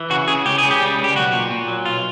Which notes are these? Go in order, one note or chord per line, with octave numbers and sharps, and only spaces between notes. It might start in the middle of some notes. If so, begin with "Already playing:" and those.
Already playing: E3
C#3 F#4
C#3 G#4
C#2 G4
G#4
C#3
G4
G3
C#2
G4
B1 F#4
A#2
A#2
F#3
B1 F4